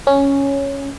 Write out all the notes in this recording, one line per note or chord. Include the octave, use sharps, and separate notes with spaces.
C#4